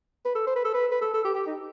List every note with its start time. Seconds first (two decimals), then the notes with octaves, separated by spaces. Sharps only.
0.25 B4
0.35 A4
0.47 C5
0.55 B4
0.65 A4
0.74 B4
0.92 B4
1.01 A4
1.14 A4
1.24 G4
1.35 G4
1.47 D#4